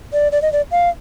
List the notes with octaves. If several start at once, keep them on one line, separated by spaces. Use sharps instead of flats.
D5
D5
D#5
D5
F5